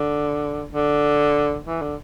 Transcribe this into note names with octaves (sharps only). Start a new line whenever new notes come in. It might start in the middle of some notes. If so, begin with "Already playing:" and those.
Already playing: D3
D3
E3
D3